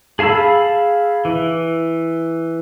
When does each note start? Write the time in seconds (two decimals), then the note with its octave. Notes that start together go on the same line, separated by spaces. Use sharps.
0.19 G#4 F5 A5 B5 E6
1.25 E3